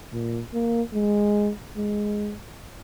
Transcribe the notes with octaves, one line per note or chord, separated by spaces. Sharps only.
A#2
A#3
G#3
G#3